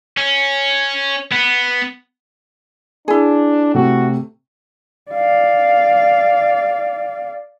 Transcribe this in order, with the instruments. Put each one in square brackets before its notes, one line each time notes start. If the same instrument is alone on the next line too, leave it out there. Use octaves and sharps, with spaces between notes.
[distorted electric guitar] C#4
B3
[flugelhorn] D4 [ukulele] E4 G#4
[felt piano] C3 A3 [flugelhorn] F#4
[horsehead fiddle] D5 F5